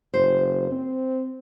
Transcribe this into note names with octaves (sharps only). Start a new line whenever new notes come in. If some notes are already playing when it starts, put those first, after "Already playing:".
F#1 C5
C4